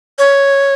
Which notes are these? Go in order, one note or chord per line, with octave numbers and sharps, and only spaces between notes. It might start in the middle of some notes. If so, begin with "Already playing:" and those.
C#5